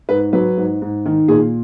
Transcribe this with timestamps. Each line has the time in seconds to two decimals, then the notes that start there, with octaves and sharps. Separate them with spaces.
0.09 G#2 B4
0.33 F#3 B4
0.57 G#2
0.82 G#2
1.06 D#3
1.28 A#2 G#4